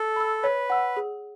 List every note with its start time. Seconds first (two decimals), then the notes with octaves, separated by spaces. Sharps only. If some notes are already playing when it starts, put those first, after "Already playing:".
Already playing: A4
0.16 B5 E6
0.43 B4 C#5
0.70 F#5 A5 E6
0.97 G#4